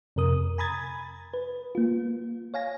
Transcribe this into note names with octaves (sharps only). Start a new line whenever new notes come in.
F2 C3 A#4 D#6
G#5 A#5 B5 D#6 G#6 A6
B4
A#3 F4
C#5 F5 G#5 A#6